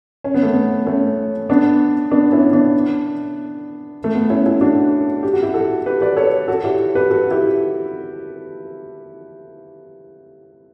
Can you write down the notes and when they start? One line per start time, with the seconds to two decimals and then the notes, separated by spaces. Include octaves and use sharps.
0.24 C#4
0.34 B3
0.43 A3
0.53 B3
0.86 A3 C#4
1.50 B3 D4
2.11 B3 D4
2.32 C#4 E4
2.53 B3 D4
4.04 A3
4.15 B3
4.30 C#4 E4
4.46 C#4 E4
4.61 D4 F#4
5.23 G4
5.33 F#4
5.43 E4 G4
5.54 F#4 A4
5.86 G4 B4
6.01 B4 D5
6.16 A4 C#5
6.48 F#4 A4
6.64 E4 G4
6.95 G4 B4
7.10 F#4 A4
7.31 E4 G4